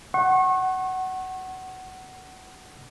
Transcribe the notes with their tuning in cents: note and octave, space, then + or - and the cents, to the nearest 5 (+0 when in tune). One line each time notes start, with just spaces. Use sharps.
F#5 +15 C#6 -35